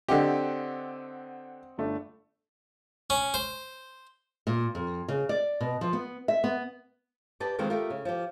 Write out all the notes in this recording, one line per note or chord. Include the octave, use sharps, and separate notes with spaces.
D3 C4 G4 D#5 F#5
G1 A3 D4
C#4
C5
A#2
F2
C#3
D5
B2
F3
B3
E5
B3
G4 B4 D5 D#5 A5
F2 D#3 G#3 C4 F5
A3 D#4 F4 G4 A#4
C#3
F3 G4